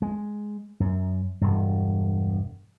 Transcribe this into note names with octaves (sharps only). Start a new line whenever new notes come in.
G#3
F#2
E1 G2